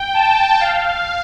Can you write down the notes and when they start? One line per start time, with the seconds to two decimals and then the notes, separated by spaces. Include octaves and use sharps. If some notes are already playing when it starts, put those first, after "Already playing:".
Already playing: G5
0.14 A5
0.61 F5